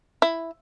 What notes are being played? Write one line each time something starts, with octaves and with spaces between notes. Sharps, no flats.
E4